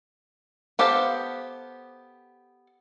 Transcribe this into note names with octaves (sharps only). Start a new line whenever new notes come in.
B3 G4 A4 C5 F5